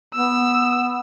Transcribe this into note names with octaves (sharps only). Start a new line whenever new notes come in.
B3 E6